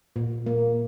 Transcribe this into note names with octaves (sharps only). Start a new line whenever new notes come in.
A#2
A#3